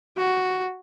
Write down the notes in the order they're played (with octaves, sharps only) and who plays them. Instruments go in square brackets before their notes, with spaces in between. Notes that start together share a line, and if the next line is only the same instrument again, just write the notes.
[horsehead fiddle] F#4